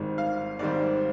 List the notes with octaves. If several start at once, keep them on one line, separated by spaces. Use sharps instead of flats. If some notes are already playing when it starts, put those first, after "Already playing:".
Already playing: G#1 G#2 D#3 G3 C4
F5
G#1 G#2 D#3 G3 C4 D5